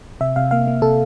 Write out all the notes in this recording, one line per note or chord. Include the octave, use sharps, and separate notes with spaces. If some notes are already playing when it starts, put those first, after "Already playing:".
C3 E5
C3 F5
A#3 F5
A#3
C3 A4